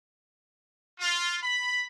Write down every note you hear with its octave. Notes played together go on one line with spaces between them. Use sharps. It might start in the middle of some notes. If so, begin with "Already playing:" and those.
F4
B5